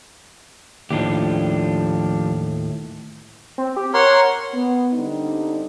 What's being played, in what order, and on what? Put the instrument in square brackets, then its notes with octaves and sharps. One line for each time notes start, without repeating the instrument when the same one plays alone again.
[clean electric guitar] D#2 A2 [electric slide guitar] F3 D4 G4
[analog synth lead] C4
G4
[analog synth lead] A#4 [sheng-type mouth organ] C#5 F#5 C6
[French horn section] B3
D3 G3 C4 D4 D#4